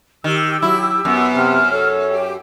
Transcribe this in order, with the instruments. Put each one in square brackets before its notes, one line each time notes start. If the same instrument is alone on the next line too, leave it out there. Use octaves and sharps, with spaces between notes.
[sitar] D#3 [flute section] G4 E6
[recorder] F#3 [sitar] E4
[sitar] F#2 [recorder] B3
[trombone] C3 [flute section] F6
[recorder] A4 [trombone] C#5
[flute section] G4 G5